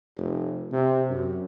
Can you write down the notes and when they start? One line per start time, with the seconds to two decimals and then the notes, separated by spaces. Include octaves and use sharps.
0.17 F1
0.72 C3
1.09 F#2